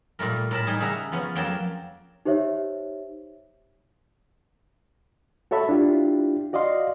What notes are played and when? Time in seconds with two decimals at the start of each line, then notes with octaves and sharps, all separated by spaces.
0.19 A#2 G3 A3 A#4
0.51 A2 A#4 A5 B5
0.67 G3 D#4 G#4
0.80 C#3 G#4 E5 F#5 A#5
1.12 F3 B3 C#4
1.35 F2 F#3 A#3 G5 A5
2.25 D#4 G4 C5 C#5 E5
5.51 F#4 A4 C#5 E5 A5 B5
5.69 D4 E4 F4 G4
6.53 F#4 D5 D#5 F5 C6